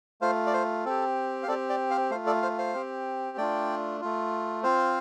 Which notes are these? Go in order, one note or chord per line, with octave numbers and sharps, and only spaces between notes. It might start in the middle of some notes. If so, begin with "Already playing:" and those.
A3 F4 C5 F5
D5
C5
C4 G4 A4
F5
C4 G4 A4 D5
D5 G5
C5 F5
A3 F4 C5 F5
A4 D5
C5 F5
C5 F5
C4 G4
A3 D4 F4 D5 G5
A3 F4
C4 F4 C5 F5